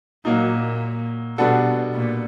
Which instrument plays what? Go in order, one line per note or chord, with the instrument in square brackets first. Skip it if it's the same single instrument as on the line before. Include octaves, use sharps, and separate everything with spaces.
[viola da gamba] A#2 [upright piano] F#3 A#3 D#4
[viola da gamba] B2 [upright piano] G3 B3 D4 F#4 A4
[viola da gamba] A#2